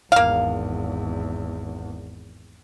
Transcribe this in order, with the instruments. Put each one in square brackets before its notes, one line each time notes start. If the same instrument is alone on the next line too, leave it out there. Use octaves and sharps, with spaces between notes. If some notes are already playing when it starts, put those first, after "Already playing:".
[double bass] G#1 E2 [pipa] A#3 F5